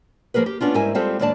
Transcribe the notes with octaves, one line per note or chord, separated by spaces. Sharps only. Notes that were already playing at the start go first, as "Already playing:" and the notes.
F3 A#3 G#4 A#4 B4
G4
B3 C#4 D4 F4
G#2 G3 E4 A#4 E5 G#5
G3 G#3 C4 F4 G4 A4
D#2 G#2 D4 D5 A5